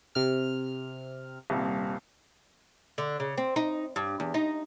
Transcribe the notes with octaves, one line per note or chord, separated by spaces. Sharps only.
C3 F6
D#1 C2
D3
C#3
C4
D#4
G2
E2
D#4